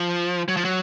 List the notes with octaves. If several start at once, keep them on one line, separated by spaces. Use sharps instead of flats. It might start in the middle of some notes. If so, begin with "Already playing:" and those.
Already playing: F3
F#3
F3
F#3